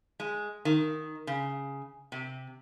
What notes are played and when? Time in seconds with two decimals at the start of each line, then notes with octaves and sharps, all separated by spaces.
0.20 G#3
0.65 D#3
1.27 C#3
2.12 C3